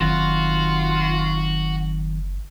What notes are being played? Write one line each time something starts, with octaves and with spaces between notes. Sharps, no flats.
F#1 D#3 F#3 C4 F4 F#4